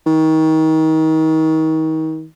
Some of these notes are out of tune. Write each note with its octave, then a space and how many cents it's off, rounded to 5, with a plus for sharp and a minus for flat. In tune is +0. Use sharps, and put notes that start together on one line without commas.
D#3 +30